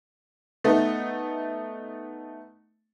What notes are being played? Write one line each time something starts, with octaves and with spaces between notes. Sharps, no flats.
A3 B3 D#4